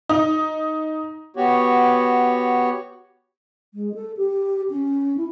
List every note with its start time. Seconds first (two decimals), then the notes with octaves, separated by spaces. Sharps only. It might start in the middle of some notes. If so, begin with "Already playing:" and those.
0.09 D#4
1.36 B3 F#4 G4 C#5
3.74 G#3
3.95 A4
4.17 G4
4.70 C#4
5.17 E4